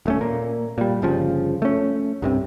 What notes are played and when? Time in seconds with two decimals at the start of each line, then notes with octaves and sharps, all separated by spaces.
0.06 D#1 A3 C#4
0.21 A#2 A#3
0.78 A#2 G3
1.02 G1 C#3 F3
1.62 A3 C#4
2.22 C2 G2 C3